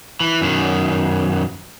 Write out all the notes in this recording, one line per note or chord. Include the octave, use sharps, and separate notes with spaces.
E3
F#2 D#3